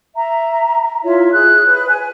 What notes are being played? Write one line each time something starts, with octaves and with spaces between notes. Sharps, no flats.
E5 A#5
E4 F4 C#5 E5
G#4 F#6
B4
G#5